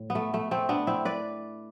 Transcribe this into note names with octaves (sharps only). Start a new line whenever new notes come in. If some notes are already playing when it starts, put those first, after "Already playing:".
Already playing: A2
B3
A3
A3
A3 C4
B3 D4
C4 E4
B4 D5